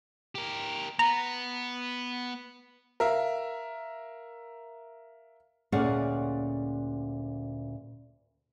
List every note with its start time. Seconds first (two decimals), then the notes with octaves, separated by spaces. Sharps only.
0.35 G4 A#4
0.99 B3 A#5
3.00 A#4 E5 F5
5.72 D2 A#2 C#4 G#4 D5 F#5